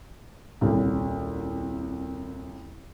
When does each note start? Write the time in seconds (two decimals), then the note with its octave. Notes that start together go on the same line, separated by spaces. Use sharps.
0.61 D#1 C2